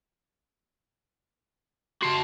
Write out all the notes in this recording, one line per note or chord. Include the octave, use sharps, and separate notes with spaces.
F#4 A5 C6